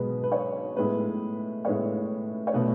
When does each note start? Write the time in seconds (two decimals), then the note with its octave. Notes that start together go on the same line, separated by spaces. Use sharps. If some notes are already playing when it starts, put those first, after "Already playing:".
Already playing: B2 G#3 B3 B4
0.23 B4
0.32 C#5
0.76 A2 G#3 B3 B4
1.65 A2 G#3 B3 C#5
2.47 C#5
2.54 B2 A3 B4